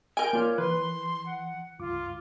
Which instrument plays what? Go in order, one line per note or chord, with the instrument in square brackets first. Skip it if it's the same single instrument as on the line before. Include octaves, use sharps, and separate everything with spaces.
[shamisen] A#4 G#5 [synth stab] G6 D7
[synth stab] A#3 F4 [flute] C#5 [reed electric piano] D5 D6 F6
[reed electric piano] E3 [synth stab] B4 [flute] C6
[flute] F#5
[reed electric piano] C#2 G2 D6 [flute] F4